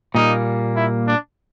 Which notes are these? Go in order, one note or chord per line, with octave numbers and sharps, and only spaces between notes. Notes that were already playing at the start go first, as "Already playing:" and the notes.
A#2 G3 A#3 D#4
E4
D4